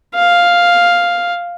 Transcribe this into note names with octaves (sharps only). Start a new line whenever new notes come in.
F5